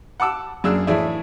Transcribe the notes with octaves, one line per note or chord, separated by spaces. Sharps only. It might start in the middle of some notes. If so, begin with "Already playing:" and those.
F#5 A5 D6 E6
F#2 A#3 D4 G#4 E6
A2 E3 G#4 D5 E5